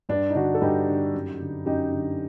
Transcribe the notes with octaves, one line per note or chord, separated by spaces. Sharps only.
G2 D4
D#4
D3 D4 F#4
A4
G2 D#4 G4
D3
F#2
D3
F#2 D#4 G4
D3